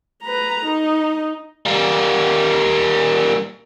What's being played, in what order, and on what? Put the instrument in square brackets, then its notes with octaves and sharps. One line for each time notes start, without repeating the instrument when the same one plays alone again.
[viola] B4 A#5
D#4
[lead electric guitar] G3 A#3